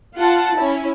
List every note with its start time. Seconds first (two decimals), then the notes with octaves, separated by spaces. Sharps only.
0.16 F4 F#5 A5
0.56 C#4 E4